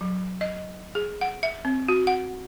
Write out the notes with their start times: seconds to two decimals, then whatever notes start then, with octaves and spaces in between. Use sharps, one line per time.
0.01 F#3
0.41 D#5
0.95 G#4
1.21 F#5
1.43 E5
1.65 C4
1.88 F#4
2.07 F#5